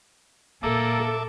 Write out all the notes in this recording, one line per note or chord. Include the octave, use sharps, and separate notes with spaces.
A#2 G#3 A#3 A4 E5 A5 D6